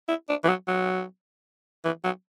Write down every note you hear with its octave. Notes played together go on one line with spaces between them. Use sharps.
E4
D4
E3
F#3
F#3
E3
F#3